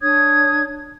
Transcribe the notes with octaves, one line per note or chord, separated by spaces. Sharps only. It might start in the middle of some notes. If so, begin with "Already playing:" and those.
D4 C#5 D#6 G#6